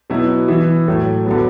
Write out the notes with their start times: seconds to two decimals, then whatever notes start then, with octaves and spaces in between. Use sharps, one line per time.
0.10 B2 F#3 B3 E4
0.48 E3 B3 E4
0.88 A2 F#3 A3
1.26 D3 F#3 B3